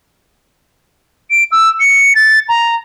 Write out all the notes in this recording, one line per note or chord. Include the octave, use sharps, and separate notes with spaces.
D7
E6
C#7
A6
A#5